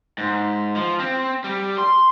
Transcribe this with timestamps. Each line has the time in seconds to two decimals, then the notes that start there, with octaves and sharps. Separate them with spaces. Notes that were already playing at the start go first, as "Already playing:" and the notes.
0.18 G#2
0.76 F3
1.00 C4
1.44 G3
1.78 C6